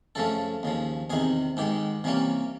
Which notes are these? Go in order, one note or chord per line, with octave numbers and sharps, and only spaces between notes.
F#2 C#3 F3 A3 C#4 A4
D#2 C#3 F3
E2 C3 D#3 G#4
G#2 D#3 G#3 G4
C3 E3 G3 A#3 C#4